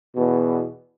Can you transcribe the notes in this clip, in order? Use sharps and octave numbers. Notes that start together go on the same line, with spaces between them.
E2 B2